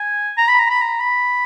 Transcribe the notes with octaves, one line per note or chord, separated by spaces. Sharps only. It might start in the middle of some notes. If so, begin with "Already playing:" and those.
Already playing: G#5
A#5
B5
A#5
B5
A#5
B5